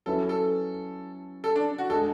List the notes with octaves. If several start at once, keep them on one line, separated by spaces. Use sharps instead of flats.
F#3 C#4 E4 A4 B4
A4
A4
D4
F#4
G#3 D4 G#4 A4